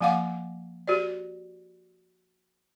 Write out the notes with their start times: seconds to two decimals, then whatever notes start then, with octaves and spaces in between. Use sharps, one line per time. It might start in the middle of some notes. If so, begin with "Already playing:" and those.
0.01 F3 A#3 F5 F#5 D6
0.88 F#4 G4 C5 D5